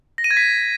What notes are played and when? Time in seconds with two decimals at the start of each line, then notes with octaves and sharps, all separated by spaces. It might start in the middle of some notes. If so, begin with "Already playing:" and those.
0.18 A#6
0.24 D#7
0.31 G#6
0.37 B6